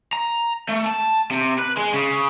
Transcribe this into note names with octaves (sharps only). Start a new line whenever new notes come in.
A#5
A3
A5
C3
B4
G#3
C#3